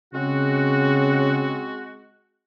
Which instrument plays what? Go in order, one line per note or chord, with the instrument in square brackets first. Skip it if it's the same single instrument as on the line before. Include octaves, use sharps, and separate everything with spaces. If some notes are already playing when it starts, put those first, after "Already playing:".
[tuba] C#3 [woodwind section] G#3 C4 F#4